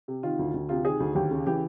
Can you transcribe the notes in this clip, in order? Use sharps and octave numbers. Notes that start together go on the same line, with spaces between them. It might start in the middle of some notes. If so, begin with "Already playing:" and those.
C3
D#3 F4
D2
D2
C3 F4
D#3 G#4
D2
D#2 G4
C#3
E3 G4